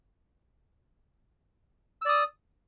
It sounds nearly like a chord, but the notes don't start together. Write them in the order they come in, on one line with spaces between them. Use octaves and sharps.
E6 D5 D#6